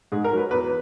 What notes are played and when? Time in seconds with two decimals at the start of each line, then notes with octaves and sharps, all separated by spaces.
0.12 G#2 G#4
0.24 A#4
0.32 F#3
0.37 B4
0.51 E2 B4